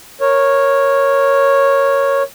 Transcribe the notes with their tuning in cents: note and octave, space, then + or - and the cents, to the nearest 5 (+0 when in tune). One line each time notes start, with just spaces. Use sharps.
A#4 +0 C#5 -5